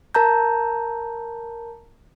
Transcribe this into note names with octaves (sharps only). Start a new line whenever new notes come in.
A#4 A5 A#5 G6